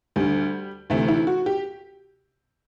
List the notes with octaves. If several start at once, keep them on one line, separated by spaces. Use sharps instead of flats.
D2 D3 G3
D2 C3 E3 A3
E4
F#4
G4